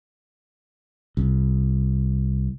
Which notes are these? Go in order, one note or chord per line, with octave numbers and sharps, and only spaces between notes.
C2